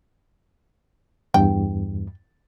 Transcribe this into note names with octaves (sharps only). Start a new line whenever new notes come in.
E2 G2 G5